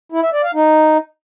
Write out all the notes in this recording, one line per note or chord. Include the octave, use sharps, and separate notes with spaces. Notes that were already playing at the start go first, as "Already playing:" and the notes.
E4
E5
D5
F5
D#4